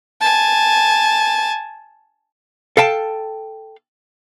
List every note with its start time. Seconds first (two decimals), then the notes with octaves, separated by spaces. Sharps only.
0.21 G#5 A5
2.77 A4 F5 G5 A5